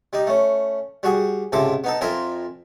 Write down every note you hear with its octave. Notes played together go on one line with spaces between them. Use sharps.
G3 D#4
A3 C#4
G3 F#4 G#4
C#2 G#2 C3 A4 E5 D6
B3 D#4 A4
F2 F3 A#4 E5 G#5 A#5